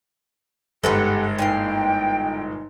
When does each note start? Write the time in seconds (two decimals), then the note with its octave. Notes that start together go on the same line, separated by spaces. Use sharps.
0.84 G1 G#2 G4 A4 B4 F#5
1.39 A#2 E3 D#4 F5 G5